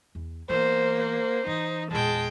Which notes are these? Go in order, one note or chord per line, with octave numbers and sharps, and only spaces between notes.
E2
E3 A#3 B3 C5
C5
E3 D#4
E2 A#2 G#3 G5 A5